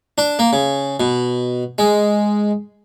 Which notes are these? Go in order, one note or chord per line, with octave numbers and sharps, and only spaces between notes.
D4
A#3
C#3
B2
G#3